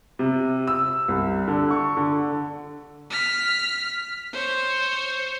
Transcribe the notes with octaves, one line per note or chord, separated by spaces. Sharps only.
C3
E6
C2
D3
C#6
D3
F6 B6
C5 C#5